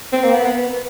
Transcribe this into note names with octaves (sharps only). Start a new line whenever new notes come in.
C4
A#3
B3
B3